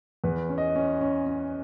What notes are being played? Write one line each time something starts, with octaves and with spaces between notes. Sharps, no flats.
E2 B4
C#4
D#5
C#4
C#4
C#4